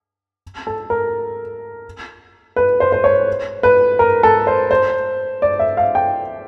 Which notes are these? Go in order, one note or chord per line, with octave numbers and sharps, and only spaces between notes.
A4
A#4
B4
C5
C5
C#5
B4
A#4
A4
C5
C5
D5
E5
F5
G5